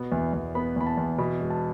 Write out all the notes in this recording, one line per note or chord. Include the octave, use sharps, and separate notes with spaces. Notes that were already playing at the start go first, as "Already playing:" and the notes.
Already playing: B2 B3
E2
E2
B3 B5
E2 B5
A5
E2
B2 B5
E1
A5